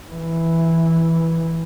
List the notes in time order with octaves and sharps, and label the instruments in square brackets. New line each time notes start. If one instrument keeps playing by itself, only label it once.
[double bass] E3